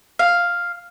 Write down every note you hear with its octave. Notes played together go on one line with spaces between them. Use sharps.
F5